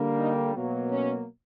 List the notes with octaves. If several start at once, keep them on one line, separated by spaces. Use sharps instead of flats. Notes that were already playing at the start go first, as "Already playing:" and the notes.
Already playing: D3 G3 A#3
D#4
B2 F#3 A#3
C#4